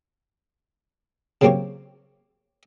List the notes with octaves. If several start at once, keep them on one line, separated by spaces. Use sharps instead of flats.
C#3 F#3 A#3 C4 G4 C#5